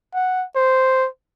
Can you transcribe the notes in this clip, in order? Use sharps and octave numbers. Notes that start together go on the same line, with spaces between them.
F#5
C5